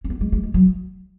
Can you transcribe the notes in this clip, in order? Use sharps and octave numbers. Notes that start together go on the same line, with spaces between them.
C#4
B3
G#3
G#3
G#3
F#3